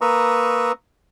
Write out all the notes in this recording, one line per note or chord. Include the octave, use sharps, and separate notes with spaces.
A#3 B4 A#5 C#6 D#6 E6